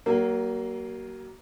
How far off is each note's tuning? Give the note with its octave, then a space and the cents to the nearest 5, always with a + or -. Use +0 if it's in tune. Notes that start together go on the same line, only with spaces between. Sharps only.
F#3 +40 A#3 +5